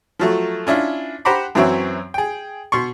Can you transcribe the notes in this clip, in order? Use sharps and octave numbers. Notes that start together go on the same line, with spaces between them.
F3 F#3 A3
C#4 D4 E4 F4
G4 C5 F#5 A#5 B5 D6
F#2 E3 F#3 C4 C#5 E5
G#4 G5
B2 C6 C#6